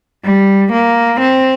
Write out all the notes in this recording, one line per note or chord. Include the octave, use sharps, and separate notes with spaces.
G3
A#3
C4